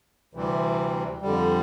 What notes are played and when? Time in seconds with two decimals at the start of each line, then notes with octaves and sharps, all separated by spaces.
0.34 D2 C3 E3 G3 C4
1.22 F2 D3 G3